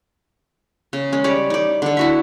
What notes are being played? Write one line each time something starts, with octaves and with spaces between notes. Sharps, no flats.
C#3
G#3 C#4
G3 C#5 D5
D#4 D5
D3 A4
E4 F#4 E5